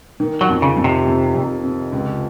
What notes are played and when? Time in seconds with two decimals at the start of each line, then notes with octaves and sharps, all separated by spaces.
0.20 D#3
0.41 F#3
0.49 F2
0.62 C#3
0.77 F2
0.84 C3
1.06 F2
1.34 F2
1.64 C3
1.92 C#2